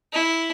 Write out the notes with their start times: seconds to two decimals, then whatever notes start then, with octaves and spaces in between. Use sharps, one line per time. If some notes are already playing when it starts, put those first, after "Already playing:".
0.13 E4